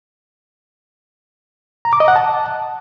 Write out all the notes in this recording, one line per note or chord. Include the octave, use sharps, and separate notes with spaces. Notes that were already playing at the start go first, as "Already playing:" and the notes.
A#5
D6
D#5
F#5
A5